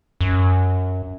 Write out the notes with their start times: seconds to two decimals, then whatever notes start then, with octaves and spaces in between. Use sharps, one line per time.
0.21 F#2